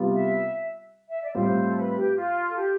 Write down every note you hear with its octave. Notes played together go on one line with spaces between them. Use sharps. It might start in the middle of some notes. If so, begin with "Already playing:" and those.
Already playing: C3 G3 B3 F4
E5
E5
D5
A2 G3 C4 F4 C5
A4
B4
G4
F4
A4
G4